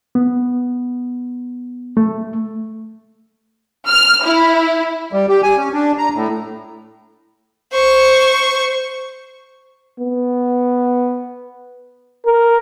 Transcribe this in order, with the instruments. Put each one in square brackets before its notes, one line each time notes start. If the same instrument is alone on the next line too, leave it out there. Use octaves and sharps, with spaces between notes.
[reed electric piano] B3
A3
[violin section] F6
E4
[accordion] G3
G4
G#5
C#4
D4
A#5
A2
[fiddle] C5 C#6
[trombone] B3
A#4